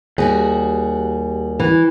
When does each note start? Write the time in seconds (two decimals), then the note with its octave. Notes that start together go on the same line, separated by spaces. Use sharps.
0.18 D#2 G3 F#4 G#4
1.59 E3